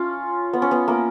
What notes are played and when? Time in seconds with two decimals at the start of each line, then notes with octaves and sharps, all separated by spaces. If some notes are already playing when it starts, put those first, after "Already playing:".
Already playing: C#4 F4
0.53 B3
0.62 C#4
0.71 B3
0.88 A#3